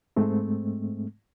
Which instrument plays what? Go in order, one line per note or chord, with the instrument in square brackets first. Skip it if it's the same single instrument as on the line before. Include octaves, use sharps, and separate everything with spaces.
[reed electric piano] G#2 G#3 A3 C4